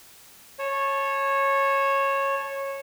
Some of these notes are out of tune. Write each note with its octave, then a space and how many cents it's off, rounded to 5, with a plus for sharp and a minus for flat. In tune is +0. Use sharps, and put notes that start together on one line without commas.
C#5 -15 A5 -20